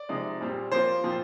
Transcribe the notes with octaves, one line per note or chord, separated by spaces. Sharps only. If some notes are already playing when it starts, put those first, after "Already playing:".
Already playing: D5
C3 F3 G#3 D#4
A#2 G3 C4
F3 A#3 F4 C5
A#2 F3 C4 F4